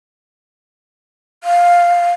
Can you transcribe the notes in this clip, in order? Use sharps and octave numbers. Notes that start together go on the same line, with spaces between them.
F5